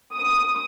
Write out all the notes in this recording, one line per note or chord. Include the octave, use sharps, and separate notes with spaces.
D#6